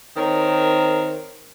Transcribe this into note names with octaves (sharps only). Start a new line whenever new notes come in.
D#3 C4 A#4 C#5